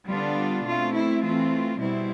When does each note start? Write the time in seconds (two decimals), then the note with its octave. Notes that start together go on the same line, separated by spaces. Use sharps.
0.08 D3 G3 B3 D4 F4
0.66 B2 A3 C4 F4
0.94 E4
1.23 E3 A3 C4 F4
1.79 B2 G3 C4 E4